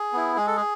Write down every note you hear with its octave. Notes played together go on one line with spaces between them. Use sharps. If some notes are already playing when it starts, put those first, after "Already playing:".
Already playing: G#4
B3 E4
G#3 G#4
A4
G#4